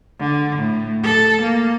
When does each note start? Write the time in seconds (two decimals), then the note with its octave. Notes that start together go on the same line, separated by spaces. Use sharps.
0.20 D3
0.59 A2
1.04 A4
1.43 A#3